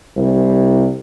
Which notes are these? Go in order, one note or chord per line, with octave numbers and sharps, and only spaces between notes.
C2